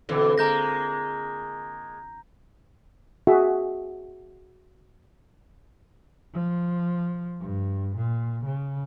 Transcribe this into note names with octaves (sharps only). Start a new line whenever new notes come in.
B2 D3 E3 C4 F4
G#3 A#3 A#5 G6 A#6
F#4 G#4 E5
F3
G2
A#2
C#3